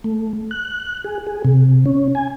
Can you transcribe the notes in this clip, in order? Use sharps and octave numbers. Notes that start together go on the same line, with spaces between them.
A3
F#6
G#4
G#4
C3
C#4
G#5